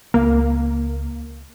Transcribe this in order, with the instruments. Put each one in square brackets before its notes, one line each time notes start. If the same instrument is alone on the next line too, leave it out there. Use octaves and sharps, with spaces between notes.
[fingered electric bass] C#2 [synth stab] A#3